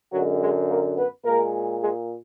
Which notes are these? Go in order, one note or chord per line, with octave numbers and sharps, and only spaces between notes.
F#2 D3 F#3 G#3 F#4
G#3 G#4
A#3 A#4
B3 B4
A#2 G#3 A#3 A#4
G#3 G#4